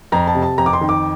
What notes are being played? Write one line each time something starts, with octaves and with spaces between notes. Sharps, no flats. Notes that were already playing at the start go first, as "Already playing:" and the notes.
F2 A#5
A5
C3
A5
F2 A#5
D6
C6
D#3
D6